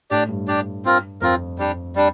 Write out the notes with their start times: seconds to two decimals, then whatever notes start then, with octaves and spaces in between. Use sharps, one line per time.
0.11 A2 D4 G4 D5
0.29 G2
0.48 D4 G4 D5
0.85 C4 F4 A#4
1.21 F2 C4 F4 A#4
1.58 G3 D4 G4
1.96 G3 D4